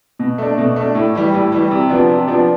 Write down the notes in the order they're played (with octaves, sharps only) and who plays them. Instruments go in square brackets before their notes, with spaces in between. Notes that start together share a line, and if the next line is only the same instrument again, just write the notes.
[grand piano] B2
A3 D4
B2
A3 D4
A2
E3 G3
A2
E3 G3
C3
F3 B3 D4
C3
F3 B3 D4